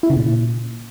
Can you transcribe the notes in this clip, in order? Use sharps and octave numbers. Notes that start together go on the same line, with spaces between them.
E4
C#3
A#2